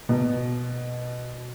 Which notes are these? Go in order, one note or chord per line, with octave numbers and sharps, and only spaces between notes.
B2